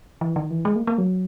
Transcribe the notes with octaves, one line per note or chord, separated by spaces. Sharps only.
E3
D#3
E3
G#3
A#3
A#3
F#3